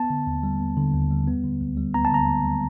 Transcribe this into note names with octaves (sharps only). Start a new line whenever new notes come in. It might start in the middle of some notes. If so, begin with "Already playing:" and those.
Already playing: B3 A5
D3
D#2
G3
B3
D3
D#2
G3
B3
D3
D2
G3
B3 A#5
A5
D3 A#5
D2
G3